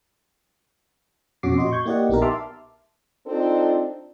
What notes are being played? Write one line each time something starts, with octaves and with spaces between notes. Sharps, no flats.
F2 B2 C#4 F#4 D6 C7
A#2 F#4 D#5 C6
C#6 G6 G#6
A#3 E4 G4 D5 D#5 F#5
A#1 B3 D#4 G4 A#4
E5 A5 C6 D6 F6
C4 D4 D#4 F4 A4